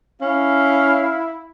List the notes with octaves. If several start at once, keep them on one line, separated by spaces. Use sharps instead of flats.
C#4 E4 F5